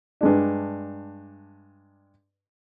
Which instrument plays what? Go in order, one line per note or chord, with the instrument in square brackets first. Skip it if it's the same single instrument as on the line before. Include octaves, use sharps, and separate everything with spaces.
[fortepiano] G2 G#3 D4